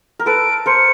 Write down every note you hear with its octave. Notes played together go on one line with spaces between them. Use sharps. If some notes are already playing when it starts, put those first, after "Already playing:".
A#4
A4 B4 D7
A#4 C5 C#7